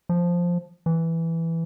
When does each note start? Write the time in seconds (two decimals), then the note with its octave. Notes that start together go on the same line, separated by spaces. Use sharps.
0.09 F3
0.86 E3